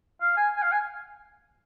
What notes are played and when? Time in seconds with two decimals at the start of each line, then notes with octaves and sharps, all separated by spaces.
0.21 F5
0.37 G#5
0.57 G#5
0.62 F5
0.72 G#5